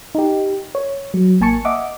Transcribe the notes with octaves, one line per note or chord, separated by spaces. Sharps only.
D#4 G4
C#5
F#3
A1 A#3 G#5 A5 C#6 C#7
D#5 E5 F#5 D6